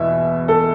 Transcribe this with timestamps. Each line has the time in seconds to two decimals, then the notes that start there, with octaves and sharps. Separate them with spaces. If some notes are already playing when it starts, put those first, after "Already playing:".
Already playing: E2 B2 E5
0.48 A4